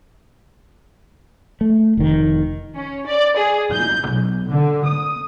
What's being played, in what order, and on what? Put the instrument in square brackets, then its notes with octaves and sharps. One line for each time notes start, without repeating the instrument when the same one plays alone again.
[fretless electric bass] A3
F1 D#3
[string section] C#4
D5
G#4
G6
B1
D3
D#6